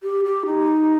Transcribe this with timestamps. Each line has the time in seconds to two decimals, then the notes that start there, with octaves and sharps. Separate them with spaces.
0.03 G4
0.24 G4
0.46 D#4